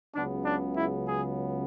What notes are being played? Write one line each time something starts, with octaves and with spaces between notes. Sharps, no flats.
C#2 C#3 F#3 B3 D4
D4
E4
G#4